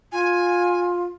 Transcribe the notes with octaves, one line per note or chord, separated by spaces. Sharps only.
F4 G#5